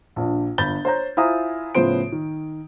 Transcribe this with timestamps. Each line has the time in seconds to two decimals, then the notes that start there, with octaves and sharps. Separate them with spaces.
0.16 A#1 D4
0.58 G1 B5 G6 A6 G7
0.85 C5 C#5 A#5 G6
1.17 E4 F4 C5 G#5 A#5 D#6
1.75 A2 C#3 F3 B3 C5 D7
2.12 D#3